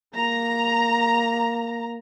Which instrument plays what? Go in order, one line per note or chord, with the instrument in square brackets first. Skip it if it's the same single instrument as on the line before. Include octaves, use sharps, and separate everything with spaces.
[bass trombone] A#3 [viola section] A#5